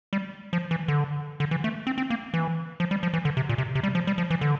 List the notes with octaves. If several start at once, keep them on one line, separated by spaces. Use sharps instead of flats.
G3
F3
E3
D3
D3
E3
A3
C4
C4
A#3
E3
F3
G3
F3
E3
D3
C3
A#2
C3
C3
G3
F3
G3
F3
E3
D3